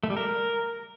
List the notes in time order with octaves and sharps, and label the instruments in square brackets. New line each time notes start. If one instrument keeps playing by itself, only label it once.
[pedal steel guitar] A3
G3
A#4